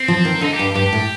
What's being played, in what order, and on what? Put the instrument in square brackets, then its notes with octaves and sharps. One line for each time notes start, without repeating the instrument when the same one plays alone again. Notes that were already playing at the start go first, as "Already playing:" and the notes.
Already playing: [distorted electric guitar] C4
[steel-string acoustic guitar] F3
D#3
[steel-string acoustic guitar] D3 [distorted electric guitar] D#4
[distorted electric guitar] G4
[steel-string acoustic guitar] G2
[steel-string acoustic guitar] G2 [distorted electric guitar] G4
[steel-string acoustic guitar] A2